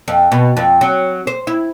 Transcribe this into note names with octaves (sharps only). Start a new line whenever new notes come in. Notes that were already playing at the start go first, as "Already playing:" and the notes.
F2
B2
F2
F#3
C5
E4